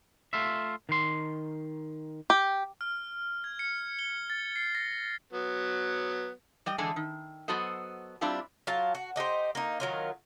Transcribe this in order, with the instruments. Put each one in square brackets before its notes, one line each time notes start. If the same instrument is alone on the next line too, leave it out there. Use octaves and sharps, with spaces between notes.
[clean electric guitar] A3 F4 E5
D#3 C6
[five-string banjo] G4
[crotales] F6
G#6
C#7
G7
A6
C7
A#6
[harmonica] F#3 B3
[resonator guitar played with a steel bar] G3 D#5 G5
D3 E3 G#3 G#4 A4
D#3
F#3 B3 F#4 A4 C5 D#5
G3 C4 D4 E4 F4 G4
[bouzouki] F#3 F4 F5 A5
F#4
D4 D#4 G4 C5
A#3 D#4
D#3 F#3 F4